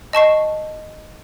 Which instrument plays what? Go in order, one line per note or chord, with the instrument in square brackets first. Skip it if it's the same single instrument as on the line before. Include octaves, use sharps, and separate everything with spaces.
[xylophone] D#5 A5 C#6 C7